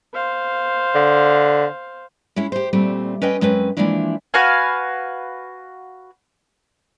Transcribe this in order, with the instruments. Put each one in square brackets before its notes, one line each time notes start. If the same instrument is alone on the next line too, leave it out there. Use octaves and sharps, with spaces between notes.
[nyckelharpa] C5 F5
[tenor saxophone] D3
[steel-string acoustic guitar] G#3 C#4 E4
G4 C5
A#2 G3 A3 C4
C#4 B4 D#5 G5
F#2 G#3 C4 C#4 B4
E3 F3 G#3 A#3 D4 E4
[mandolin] F#4 B4 F5 G#5